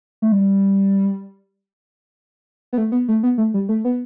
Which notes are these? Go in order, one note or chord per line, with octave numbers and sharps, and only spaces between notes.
A3
G3
B3
A3
B3
A3
B3
A3
G3
A3
B3